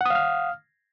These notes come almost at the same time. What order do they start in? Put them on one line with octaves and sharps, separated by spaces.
F#5 D#6 F5 F6